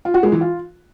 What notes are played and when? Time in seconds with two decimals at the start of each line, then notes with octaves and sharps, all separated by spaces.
0.05 F4
0.14 F#4
0.23 G#3
0.32 E3
0.41 F4